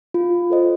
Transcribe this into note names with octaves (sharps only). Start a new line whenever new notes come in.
F4
A4 C5 D#5